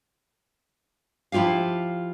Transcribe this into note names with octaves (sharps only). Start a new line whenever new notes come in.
F3 E4 F4 G4 F5